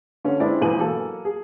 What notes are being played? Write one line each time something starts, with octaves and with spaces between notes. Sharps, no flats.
D3 C#4
G#3 C4 D4 E4 B4 D5
E1 E2 B4 D#7 F#7
F#3 A#3 A4
G#4